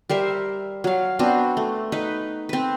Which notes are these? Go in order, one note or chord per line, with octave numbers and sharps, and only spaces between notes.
G3 A#4 C5 E5
F#3 F5
B3 C4 D4 F#4
A3
D#4 B4
C4 B4